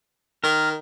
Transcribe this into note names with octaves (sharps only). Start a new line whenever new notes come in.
D#3 A#4